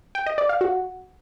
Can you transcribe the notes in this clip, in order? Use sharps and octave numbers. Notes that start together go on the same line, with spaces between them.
G5
D#5
D5
F5
F#4